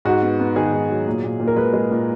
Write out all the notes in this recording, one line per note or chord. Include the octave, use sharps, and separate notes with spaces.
G#2 F#4
B3
B3
D#3 G#4
G#2
F#3
A#2
A#2
A#2
A#4
G#3 B4
G#3
A#2